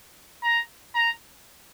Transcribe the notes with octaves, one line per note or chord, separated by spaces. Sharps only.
A#5
A#5